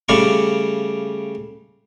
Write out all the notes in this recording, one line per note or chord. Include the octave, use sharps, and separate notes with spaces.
C#3 G3 A3 D5 F5 C#6